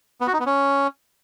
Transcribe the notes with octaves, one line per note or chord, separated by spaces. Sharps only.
B3
F#4
D#4
B3
C#4